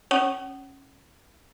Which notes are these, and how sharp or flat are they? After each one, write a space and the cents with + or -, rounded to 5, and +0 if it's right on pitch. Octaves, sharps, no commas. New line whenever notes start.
C#4 -15 F#5 +35 D#6 -20